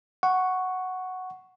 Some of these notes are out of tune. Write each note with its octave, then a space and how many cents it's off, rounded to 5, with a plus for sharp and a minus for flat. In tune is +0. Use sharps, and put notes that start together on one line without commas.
F#5 +0 C#6 +0